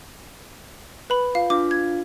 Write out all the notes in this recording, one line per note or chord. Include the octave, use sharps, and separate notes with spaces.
B4 B5
F4 F5
D4 F4 F5 D6
G#6